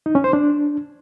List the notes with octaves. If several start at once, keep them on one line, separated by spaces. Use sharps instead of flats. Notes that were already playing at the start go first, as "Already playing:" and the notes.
D#4
C#4
C5
D4